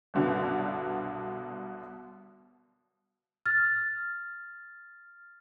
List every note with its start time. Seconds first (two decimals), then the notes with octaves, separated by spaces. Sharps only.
0.14 C2 G2 B2 D3 F#3 B3
3.46 F6 A6